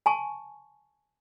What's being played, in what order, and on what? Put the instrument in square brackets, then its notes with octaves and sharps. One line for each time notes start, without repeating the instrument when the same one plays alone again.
[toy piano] G#5 A5 C#6